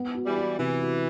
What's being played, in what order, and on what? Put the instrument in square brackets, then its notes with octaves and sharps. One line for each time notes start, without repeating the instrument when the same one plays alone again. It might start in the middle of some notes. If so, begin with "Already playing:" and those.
Already playing: [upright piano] B3
F#4
[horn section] E3 G3
[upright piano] F#4
[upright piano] C3 [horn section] E3
[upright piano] F#4